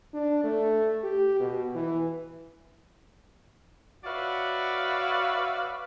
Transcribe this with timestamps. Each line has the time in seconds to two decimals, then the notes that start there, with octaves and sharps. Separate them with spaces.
0.14 D4
0.44 A3
1.04 G4
1.40 B2
1.75 E3
4.04 F#4 B4 C#5 D5 E5 F5